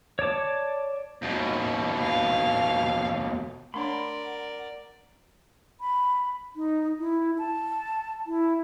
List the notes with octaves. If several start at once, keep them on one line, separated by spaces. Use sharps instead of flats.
C#5 D5 A5 D6
D#2 B2
F5
A3 D4 A#4 C#5 D5 F#5 B5 C6
B5
D#4
E4
A5
E4